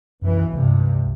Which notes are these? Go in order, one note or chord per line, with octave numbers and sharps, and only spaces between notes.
B1 F#2 E3
C#2 G2 C3